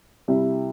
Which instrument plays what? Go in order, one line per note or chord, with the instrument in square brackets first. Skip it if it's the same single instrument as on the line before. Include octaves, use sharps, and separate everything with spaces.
[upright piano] C3 G3 E4